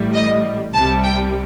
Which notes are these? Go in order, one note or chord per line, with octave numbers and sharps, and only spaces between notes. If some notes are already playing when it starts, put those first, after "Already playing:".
Already playing: A1 A2 G3
D#5
C2 C3 G3 A5
G5